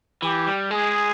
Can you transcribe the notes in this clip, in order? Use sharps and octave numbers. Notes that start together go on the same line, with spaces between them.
E3 G4
G3
G#3 G#4